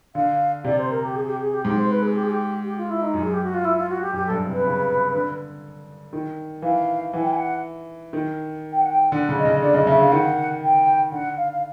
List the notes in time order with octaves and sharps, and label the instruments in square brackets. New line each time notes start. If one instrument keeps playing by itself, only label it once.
[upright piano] D3 [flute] F5
[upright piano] C3 [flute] D5
[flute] C5
A#4
G4
G#4
G4
G#4
G4
[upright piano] G#2 [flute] G4
[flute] C5
B4
G#4
G4
G#4
G4
G4
F4
E4
D#4
[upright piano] F#2
[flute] G#4
G4
F#4
F4
E4
F4
F#4
G4
[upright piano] F#2 [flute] G4
[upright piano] G2 [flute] A4
[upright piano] C3 [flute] B4
[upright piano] C#3
D3
D#3
[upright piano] E3 [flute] F5
[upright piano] E3 [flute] F#5
[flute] G5
G#5
F#5
[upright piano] D#3
[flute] G5
F#5
G5
[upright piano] D3 [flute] F#5
[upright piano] C#3
[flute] D#5
[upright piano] C#3
[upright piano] D3 [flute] D5
[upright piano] C#3 [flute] D#5
[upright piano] C#3 [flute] E5
[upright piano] D3 [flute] F5
[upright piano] D#3 [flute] F#5
[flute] G5
[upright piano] D3 [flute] F#5
[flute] F5
F5